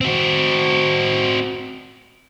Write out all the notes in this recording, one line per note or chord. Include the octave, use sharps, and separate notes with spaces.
C4 F#4